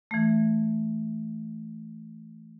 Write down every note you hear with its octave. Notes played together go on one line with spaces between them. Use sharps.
E3 A3